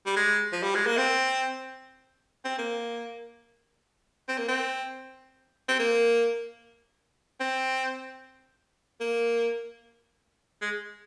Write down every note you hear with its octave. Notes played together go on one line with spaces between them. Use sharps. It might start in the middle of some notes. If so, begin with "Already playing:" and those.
G3
G#3
F3
G3
G#3
A#3
C4
C4
A#3
C4
A#3
C4
C4
A#3
C4
A#3
G#3